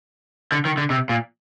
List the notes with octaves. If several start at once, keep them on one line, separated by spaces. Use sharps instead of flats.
D3
D#3
D3
C3
A#2